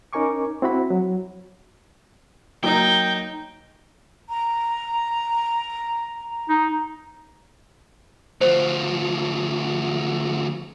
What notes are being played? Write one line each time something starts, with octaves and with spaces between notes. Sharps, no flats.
C#4 D#4 A#4 G#5 C#6 D6
C4 E4 F#4 B5
F#3
F#3 A#3 D#4 G5
A#5
D#4
D2 F3 C5